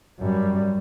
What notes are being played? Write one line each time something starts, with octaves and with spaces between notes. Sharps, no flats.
F#2 G3